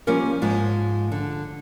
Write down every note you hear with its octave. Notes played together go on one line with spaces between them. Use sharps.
F3 G3 A#3 C#4 A#4
G#2 F3 G#3
D3